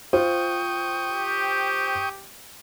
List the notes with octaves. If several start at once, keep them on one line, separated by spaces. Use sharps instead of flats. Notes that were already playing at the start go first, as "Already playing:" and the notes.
F4 C5 G5 C#6 D#6
G4